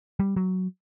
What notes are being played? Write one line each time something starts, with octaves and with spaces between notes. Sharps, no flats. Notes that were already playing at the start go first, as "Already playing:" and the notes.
G3
F#3